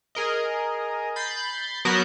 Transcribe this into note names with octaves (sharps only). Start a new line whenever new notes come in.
G#4 A#4 D#5
B5 G6 A6 C7
F#3 B3 F#4 A#4 F#6 G6